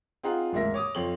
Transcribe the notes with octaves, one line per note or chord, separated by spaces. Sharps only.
C4 D#4 F4 G#4 F#5 A#5
A1 D#2 G#2 A#4 E5 A#6
C#5 D6 D#6
F2 C4 A4 C#5 F#7